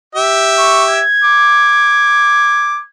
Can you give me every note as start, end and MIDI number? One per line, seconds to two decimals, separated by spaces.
0.15 1.01 67
0.15 1.01 76
0.58 0.85 85
0.90 2.89 92
1.24 2.78 86